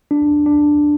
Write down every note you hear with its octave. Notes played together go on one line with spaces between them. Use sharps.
D4
D4